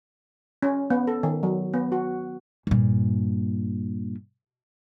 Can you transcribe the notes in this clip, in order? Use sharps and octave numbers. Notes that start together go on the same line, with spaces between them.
C#4
B3
A4
D#3
F#3
B3
F#4
G2 A#2